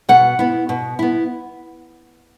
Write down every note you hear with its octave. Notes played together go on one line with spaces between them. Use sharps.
B2 F#5
B3 E4
B2
B3 E4